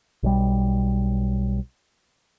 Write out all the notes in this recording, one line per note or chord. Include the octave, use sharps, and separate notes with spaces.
B1 G3